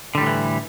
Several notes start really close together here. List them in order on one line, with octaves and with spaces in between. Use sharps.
D3 G3 A2 F#3 E3